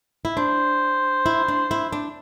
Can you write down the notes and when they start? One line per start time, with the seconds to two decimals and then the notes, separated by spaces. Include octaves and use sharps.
0.25 E4
0.37 D4 C5
1.26 E4
1.48 D4
1.71 E4
1.92 D4